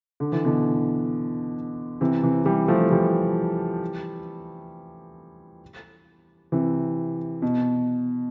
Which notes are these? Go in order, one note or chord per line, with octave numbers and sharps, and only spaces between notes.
D3
E3
B2 D3
C3 E3
C3 E3
E3 G3
F3 A3
E3 G3
C3 E3
B2